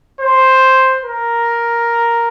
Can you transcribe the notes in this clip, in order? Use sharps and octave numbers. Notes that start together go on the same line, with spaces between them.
C5
A#4